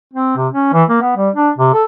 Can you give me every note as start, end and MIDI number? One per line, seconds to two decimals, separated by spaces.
0.13 0.32 60
0.36 0.48 48
0.53 0.69 61
0.73 0.84 52
0.89 1.01 58
1.02 1.14 59
1.17 1.30 55
1.36 1.50 62
1.58 1.72 48
1.73 1.84 69